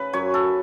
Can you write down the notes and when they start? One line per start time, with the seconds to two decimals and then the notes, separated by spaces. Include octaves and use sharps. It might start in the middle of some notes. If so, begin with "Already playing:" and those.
Already playing: C#3 B4
0.13 F#2 C#5
0.34 A4